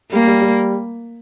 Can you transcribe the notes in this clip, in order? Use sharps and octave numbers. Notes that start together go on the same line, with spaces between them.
G3 A#3
G3
G3